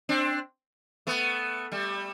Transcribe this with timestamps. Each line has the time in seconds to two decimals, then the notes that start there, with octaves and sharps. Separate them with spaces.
0.09 C4 D4
1.07 A3 B3
1.72 G3 A3